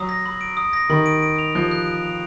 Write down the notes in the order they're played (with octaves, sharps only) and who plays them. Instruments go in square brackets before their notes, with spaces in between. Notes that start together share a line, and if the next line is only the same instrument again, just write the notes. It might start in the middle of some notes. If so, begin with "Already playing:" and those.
Already playing: [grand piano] F#3 [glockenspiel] D#6
[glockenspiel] A#6
B5
D7
D#6
A#6
[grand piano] D#3 [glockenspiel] B5
[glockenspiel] D7
D7
F7
[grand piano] F3 [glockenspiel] F#6
[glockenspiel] F#6
D7
F7